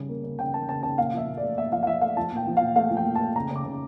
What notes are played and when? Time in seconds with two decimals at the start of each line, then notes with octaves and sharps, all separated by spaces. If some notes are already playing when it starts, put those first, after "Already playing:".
Already playing: C#3 G3
0.09 A#3
0.24 C#3
0.39 C#3 G5
0.53 A#3 A5
0.69 C#3 A5
0.83 C#3 A5
0.98 A#2 F5
1.14 F3 E5
1.27 A#2
1.37 D5
1.43 A3
1.58 A#2 E5
1.72 F3 F5
1.83 F5
1.87 F3 E5
2.01 A3 F5
2.17 F3 A5
2.32 A#2 G5
2.47 F3
2.57 A#2 F5
2.76 A3 F5
2.91 F3
2.97 G5
3.06 A#2
3.16 A5
3.21 A3
3.36 C#3 A#5
3.51 C#3 D6
3.65 C#3